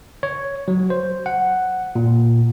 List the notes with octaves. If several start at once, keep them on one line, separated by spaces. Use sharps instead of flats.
C#5
F#3
C5
F#5
A#2